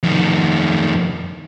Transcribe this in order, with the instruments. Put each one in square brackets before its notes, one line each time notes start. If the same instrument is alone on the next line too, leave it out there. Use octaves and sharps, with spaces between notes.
[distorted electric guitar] F2 D#3